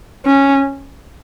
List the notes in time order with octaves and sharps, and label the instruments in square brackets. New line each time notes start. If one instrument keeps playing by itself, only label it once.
[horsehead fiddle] C#4